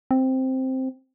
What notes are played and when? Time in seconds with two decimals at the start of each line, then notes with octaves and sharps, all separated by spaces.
0.11 C4